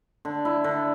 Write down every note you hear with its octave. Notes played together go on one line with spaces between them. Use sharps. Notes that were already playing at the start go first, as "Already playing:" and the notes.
D3
E4
D3